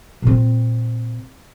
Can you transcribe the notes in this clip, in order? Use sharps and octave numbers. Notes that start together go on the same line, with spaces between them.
A#2 C4